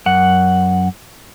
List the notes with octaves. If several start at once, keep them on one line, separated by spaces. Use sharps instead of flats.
F#2 F#5